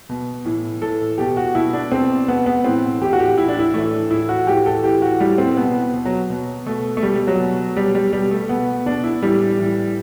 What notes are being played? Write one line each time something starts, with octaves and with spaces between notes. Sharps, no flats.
B2
A2 E3
A2 E3 A4
B2 G4
F#4
B2 E4
D4
B2 C4
B2 B3
B3
A2 E3 C4
A2 E3 G4
F#4
G4
A2 E3 E4
D4
E4
A2 E3 A3
A2 E3 E4
F#4
A2 E3 G4
A4
A2 E3 G4
F#4
A2 E3 G3
C4
B2 B3
B2
F#3
B2
B2 A3
A3
B2 G3
G3
F#3
B2
B2 G3
G3
B2 G3
A3
B2 B3
B2 D4
E4
A2 E3 G3
A2 E3